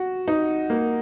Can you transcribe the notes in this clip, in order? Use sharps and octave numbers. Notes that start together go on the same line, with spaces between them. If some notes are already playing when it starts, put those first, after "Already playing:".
Already playing: F#4
D#4
A#3